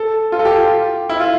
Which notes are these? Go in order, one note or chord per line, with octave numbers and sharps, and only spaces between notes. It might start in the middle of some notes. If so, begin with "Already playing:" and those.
Already playing: A4
F4
A4
G4
F4
E4
F4